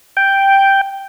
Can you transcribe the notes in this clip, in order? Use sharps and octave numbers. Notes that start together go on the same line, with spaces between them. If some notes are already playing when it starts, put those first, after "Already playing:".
G5